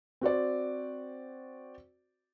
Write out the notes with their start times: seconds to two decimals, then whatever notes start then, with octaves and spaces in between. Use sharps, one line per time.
0.21 C4 F#4 C5 D5